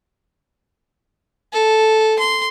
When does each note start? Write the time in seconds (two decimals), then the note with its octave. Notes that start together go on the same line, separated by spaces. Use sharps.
1.53 A4
2.19 C6